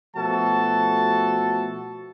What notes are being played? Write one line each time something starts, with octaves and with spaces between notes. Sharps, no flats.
B2 F3 A3 F#4 A4 A5